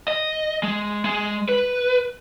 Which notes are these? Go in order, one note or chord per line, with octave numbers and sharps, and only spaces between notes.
D#5
G#3
G#3
B4